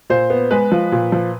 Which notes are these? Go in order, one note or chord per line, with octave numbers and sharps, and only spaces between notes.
A#2 C5
B3
G#3 B4
F3
A#2
F3